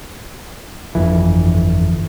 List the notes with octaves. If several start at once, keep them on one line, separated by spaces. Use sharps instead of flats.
G1 F2 E3